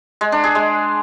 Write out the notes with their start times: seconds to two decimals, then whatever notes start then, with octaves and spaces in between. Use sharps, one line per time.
0.21 G#3
0.32 D4
0.44 G#4
0.55 G#3